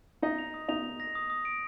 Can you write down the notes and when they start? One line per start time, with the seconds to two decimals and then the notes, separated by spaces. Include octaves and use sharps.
0.22 D#4 D#5 A#6
0.38 F7
0.54 D#6
0.68 D#4 D#5 F7
0.84 F7
1.00 A#6
1.15 D#6
1.30 D#6
1.45 D7